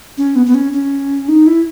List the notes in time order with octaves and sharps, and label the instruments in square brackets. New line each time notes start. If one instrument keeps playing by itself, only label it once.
[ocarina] C#4
B3
B3
C#4
C#4
D#4
E4